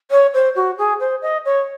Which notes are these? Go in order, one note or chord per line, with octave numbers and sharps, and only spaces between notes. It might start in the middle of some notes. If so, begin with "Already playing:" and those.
C#5
C5
F#4
G#4
C5
D#5
C#5